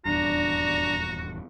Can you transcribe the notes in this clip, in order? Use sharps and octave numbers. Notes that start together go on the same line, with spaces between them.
D#1 E2 G2 D4 F#4 A#5